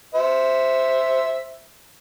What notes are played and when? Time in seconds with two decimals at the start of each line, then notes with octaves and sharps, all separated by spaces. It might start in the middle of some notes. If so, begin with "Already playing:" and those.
0.15 C5 E5